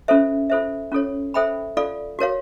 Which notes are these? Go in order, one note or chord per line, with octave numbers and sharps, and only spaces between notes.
C#4 F4 A4 C5 E5
F4 A4 C5 E5
C#4 F4 A4 C#5
A4 C5 E5 G5 B5
F4 A4 D5 F5
F#4 A#4 C#5 F5